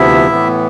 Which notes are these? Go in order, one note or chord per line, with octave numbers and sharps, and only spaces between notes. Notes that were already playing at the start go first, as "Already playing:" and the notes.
Already playing: D2 C3 F3 B3 E4 E5
A2 E3 B3